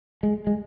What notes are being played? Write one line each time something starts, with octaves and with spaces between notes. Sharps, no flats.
G#3
G#3